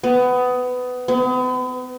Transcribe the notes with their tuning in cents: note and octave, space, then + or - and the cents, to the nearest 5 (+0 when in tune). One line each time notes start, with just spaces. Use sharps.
B3 +20
B3 +40